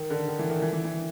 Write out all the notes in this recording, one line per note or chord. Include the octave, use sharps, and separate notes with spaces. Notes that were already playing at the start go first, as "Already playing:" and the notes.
Already playing: D#3
D3
D#3
E3
D#3
E3
E3
E3